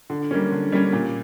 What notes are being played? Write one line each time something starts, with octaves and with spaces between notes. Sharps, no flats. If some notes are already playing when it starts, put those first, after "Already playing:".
D3
G3 A#3 C#4
D3
G3 A#3 C#4
A#2